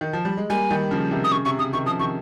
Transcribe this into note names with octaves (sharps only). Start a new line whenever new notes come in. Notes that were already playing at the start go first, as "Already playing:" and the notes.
D#3
F3
G3
G#3
G3 A#3 G#5
D#3 G3
C#3 F3
C3 D#3
D#6
C#3 C#6
C3 C#6
C#3 D#6
C3 D#3 C#6
C#3 F3 D#6
C3 D#3 C#6